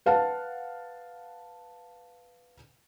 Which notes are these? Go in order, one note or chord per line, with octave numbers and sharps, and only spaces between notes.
B4 F5 F#5 A5